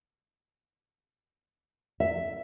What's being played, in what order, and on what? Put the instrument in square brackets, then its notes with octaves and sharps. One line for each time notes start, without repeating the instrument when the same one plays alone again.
[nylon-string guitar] E5